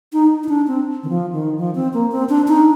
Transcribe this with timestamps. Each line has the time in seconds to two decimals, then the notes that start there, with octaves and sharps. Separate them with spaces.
0.13 D#4
0.43 D#4
0.49 D4
0.68 C4
1.03 D#3
1.09 F3
1.33 D#3
1.58 F3
1.75 C4
1.94 A#3
2.12 C4
2.29 D4
2.48 D#4